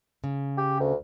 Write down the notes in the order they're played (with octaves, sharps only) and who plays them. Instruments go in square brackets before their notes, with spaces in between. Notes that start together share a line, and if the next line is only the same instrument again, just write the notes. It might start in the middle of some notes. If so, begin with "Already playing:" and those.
[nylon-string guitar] C#3
[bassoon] G4
D2